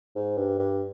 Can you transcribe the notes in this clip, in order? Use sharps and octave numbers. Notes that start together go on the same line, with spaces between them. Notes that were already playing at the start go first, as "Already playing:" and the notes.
G#2
G2
G2